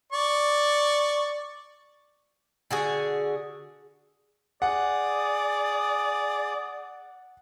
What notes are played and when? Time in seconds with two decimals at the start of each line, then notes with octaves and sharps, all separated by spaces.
0.12 D5 C#6
2.71 D3 F#4 G#4
4.62 G#4 D5 F#5 D#6